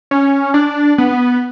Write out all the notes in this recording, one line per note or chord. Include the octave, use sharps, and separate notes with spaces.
C#4
D4
B3